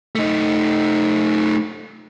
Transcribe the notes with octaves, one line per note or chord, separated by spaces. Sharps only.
A3 D#4